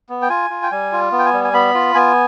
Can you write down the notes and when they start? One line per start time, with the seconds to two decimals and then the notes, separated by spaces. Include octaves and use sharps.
0.09 B3
0.22 G5
0.29 F4 G#5
0.50 F4
0.63 G5
0.71 G3 G#5
0.92 F4
1.12 B3
1.19 G5
1.26 G#5
1.33 G3
1.44 G#5
1.53 B3 B5
1.74 F4
1.95 B3 G#5